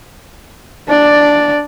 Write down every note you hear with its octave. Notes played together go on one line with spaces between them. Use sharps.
D4 D5